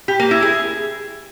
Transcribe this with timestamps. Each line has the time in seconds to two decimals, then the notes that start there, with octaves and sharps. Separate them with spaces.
0.08 G4
0.20 A#3
0.31 E4
0.42 G#4